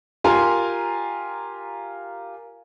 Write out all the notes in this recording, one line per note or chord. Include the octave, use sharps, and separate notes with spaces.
F4 G4 A#4 G#5 A#5 C6